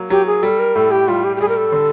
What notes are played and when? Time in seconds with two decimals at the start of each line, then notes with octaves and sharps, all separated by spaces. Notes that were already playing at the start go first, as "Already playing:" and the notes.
Already playing: F#3 A#3
0.10 F#3 G4
0.26 G#4
0.43 G3 A4
0.59 A#4
0.75 A2 A4
0.91 G4
1.08 G3 F4
1.24 G4
1.37 G4
1.40 G3 G#4
1.49 A#4
1.56 A4
1.72 D3